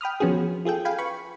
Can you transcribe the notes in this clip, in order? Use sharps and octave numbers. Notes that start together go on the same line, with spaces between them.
G5 B5 D#6 F6
F3 B3 C#4 F#4 G#4
F4 G#4 A4 G5
F5 G5 G#5 B5
B4 B5 C#6